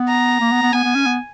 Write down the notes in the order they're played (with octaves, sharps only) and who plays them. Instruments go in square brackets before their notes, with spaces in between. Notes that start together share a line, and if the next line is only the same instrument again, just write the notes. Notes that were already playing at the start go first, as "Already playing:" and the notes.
Already playing: [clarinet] B3
[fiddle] A#5
[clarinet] A#3
B3
B3
[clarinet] B3 [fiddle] G#5
[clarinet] B3
C#4
B3